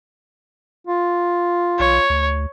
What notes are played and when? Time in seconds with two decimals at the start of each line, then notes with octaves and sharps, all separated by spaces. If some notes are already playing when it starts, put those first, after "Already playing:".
0.87 F4
1.79 B1 C#5
2.10 D2